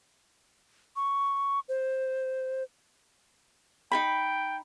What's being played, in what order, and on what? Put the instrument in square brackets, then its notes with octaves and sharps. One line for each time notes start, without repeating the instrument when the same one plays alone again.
[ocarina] C#6
C5
[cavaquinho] D#4 A#4 B5 [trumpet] G5